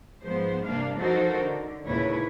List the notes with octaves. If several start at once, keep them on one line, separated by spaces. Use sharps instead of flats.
G#2 F3 G#3 B3 C5
G2 C3 A#3 D4 F5
F3 D#4 F#4 A4 A#4 C5
D3
D#2 A#2 C#3 E4 B4 C#5